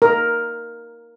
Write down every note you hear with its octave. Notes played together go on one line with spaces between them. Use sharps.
A#4